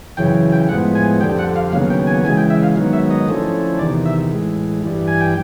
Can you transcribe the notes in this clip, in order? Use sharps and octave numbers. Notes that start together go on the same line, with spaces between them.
F#2 C#3 E3 G5
G5
A2 F3 G#3 B3 F#5
G#5
F2 D3 G3 G5
F#5
F5
D#2 C#3 F#3 B3 F5
G5
G#5
C#3 E3 G#3 G#5
G5
E5
F5
G#2 D#3 F#3 B3
E5
D#5
D3 F3 A3 C#4 E4
E2 C3 D#3 D5
E5
A2 E3 G#3
G2 E3 G3
G#5
G5